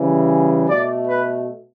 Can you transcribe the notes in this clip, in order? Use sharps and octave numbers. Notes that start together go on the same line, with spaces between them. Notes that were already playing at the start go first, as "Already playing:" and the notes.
Already playing: C#3 E3 G3
B2 A3 D5
B4